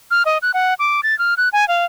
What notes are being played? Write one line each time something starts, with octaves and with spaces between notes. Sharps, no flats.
F6
D#5
F#6
F#5
D6
A6
F6
F#6
G#5
F5